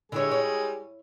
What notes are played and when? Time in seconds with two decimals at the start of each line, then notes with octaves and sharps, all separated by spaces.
0.12 D3 G3 G#3 E4 G#4 C#5
0.31 C#5